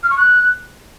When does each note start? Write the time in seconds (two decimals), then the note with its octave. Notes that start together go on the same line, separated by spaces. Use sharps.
0.03 F6
0.10 C#6
0.17 F#6